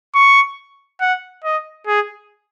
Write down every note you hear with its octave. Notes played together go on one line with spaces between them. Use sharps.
C#6
F#5
D#5
G#4